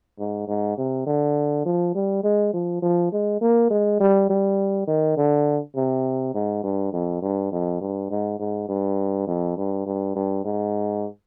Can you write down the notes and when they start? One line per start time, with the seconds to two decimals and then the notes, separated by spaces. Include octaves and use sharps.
0.19 G#2
0.48 G#2
0.77 C3
1.06 D3
1.66 F3
1.95 G3
2.24 G#3
2.54 F3
2.82 F3
3.12 G#3
3.41 A#3
3.70 G#3
4.00 G3
4.30 G3
4.87 D#3
5.17 D3
5.76 C3
6.34 G#2
6.63 G2
6.93 F2
7.22 G2
7.52 F2
7.81 G2
8.10 G#2
8.39 G#2
8.69 G2
9.28 F2
9.57 G2
9.86 G2
10.15 G2
10.45 G#2